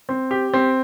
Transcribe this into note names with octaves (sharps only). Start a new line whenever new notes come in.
C4
G4
C4